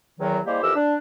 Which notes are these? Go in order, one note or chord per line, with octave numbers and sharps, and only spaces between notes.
E2 D#3 F#3
G3 G#3 A#3 E4 G4 C5
F2 E3 G4 A#4 E6
D4